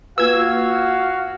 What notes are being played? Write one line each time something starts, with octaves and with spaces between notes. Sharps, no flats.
A#3 F4 F#4 B4 F5 E6 G#6